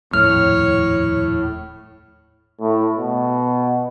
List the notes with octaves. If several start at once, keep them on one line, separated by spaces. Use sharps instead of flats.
D#1 F2 A2 A3 C#5 F6
A2
B2